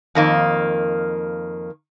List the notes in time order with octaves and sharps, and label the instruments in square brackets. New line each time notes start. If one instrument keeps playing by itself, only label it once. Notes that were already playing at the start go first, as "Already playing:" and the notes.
[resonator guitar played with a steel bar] F2 D#3 A#3